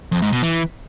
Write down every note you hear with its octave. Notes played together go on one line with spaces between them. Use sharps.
F2
G#2
B2
E3